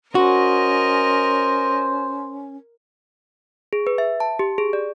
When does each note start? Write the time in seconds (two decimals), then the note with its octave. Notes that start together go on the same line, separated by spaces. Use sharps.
0.15 C#4 F#4 A#4 C5 D#5
3.73 G#4
3.87 B4
3.98 E5
4.20 A5
4.39 G4
4.58 G#4
4.73 D5